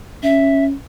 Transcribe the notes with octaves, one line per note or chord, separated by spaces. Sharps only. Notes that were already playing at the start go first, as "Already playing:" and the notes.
C#4 E5